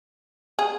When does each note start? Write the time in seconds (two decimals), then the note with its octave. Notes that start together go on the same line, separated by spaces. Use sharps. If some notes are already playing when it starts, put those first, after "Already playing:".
0.59 G#4